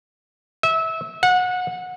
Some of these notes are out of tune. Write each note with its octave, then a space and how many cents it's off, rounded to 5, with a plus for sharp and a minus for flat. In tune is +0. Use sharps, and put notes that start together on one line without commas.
E5 -25
F#5 -25